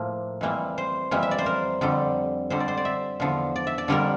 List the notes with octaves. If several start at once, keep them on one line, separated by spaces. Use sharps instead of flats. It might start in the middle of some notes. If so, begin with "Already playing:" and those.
Already playing: A2 F3 A#3
F2 E3 G3 A#3
C5
F2 E3 G3 A#3
E5
D5
C5
A#4
F2 D3 G3
F2 D3 G3 C5
D5
C5
D5
E5
E2 D3 F3
D5
E5
D5
F2 D3 G3 A#3 A#4